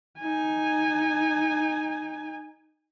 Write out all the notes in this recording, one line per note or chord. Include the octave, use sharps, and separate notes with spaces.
D#4 G#5